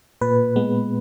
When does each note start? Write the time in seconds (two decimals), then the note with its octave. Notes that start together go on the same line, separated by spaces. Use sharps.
0.21 A#2 B4
0.56 G#3 B3